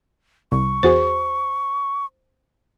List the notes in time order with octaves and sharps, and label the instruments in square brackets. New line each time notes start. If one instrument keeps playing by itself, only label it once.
[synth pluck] C2 [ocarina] C#6
[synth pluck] E2 F#4 G#4 [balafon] C5